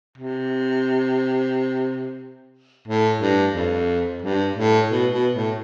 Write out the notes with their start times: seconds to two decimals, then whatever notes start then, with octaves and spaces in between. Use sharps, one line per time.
0.18 C3
2.88 A2
3.21 G2
3.55 F2
4.22 G2
4.56 A2
4.90 B2
5.12 B2
5.35 A2